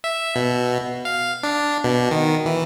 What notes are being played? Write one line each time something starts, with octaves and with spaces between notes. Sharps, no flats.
E5
B2
F5
D4
B2
D#3
E3